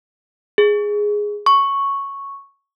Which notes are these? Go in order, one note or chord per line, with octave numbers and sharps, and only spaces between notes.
G#4
C#6